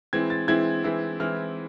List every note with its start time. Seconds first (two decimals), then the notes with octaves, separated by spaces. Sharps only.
0.13 E3 G#3 C4 E4 G#6
0.30 A6
0.48 E3 G#3 C4 E4 G#6
0.84 E3 G#3 C4 E4
1.19 E3 G#3 C4 E4 F6